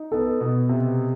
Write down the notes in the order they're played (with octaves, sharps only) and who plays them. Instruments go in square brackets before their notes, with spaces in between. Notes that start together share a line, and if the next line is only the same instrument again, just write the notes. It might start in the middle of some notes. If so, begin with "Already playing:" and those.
Already playing: [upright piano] D#4
[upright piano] B3 [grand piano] A4
[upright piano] B2
C3